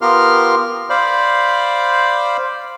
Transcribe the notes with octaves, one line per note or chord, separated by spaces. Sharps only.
B3 F4 G4 A#4 C6 F6
C5 D5 F5 B5